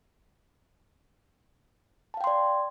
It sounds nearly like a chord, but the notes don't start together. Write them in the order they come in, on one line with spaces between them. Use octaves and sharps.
A5 F5 G5 C6 D5